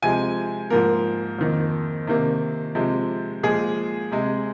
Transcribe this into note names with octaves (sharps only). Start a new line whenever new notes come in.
C3 F3 G#3 G#5
G#2 F3 A#3 A#4
F2 D#3 A#3
C3 D#3 A#3
C3 F3 G#3
A#2 F3 G#3 G#4
C3 G#3